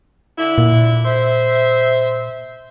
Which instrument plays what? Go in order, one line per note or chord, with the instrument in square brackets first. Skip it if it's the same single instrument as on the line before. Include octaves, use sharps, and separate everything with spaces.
[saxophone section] D3 E4
[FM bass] A#2
[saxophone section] C5 E5